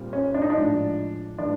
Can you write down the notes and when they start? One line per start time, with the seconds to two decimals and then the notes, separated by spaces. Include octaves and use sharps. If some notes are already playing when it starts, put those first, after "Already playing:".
Already playing: A#2 G3 C4
0.13 C#4
0.34 D4
0.42 D#4
0.50 D4
0.55 A2 F3 G#3
1.38 A2 E3 G3 D4